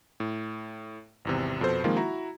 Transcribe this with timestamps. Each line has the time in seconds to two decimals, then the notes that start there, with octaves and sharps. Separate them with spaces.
0.20 A2
1.25 G#1 E2 C3
1.61 F2 B2 A4 C5
1.84 D#3 F3 G#3 A#3 C4 F4
1.96 E4 F#4 A#5